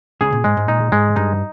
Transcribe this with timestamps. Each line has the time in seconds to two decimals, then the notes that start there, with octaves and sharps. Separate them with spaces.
0.21 C#2 C#3 G#4
0.32 A#2
0.44 G#2 G#3
0.57 G#2
0.68 A#2 D#4
0.92 G#2 G#3
1.16 G2 D#4